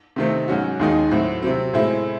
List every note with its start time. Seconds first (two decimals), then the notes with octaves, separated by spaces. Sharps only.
0.16 C3 D#3 A3 C4
0.48 G#2 F#3 C#4 F#4
0.79 D#2 D#3 G#3 D#4
1.11 A2 F#3 C4 F#4
1.42 C3 F#3 C4
1.74 A2 G#3 C4 E4